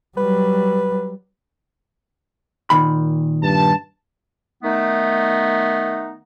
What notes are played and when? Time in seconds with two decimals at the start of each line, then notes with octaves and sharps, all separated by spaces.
0.17 F#3 G3 B4
2.70 A#2 D#3 B5
3.42 G2 A5
4.63 D#3 A3 B3 D#4